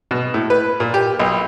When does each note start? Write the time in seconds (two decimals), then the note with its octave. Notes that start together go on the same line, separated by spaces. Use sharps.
0.11 B2
0.34 A2
0.50 B4
0.80 A#2
0.94 G4
1.19 B1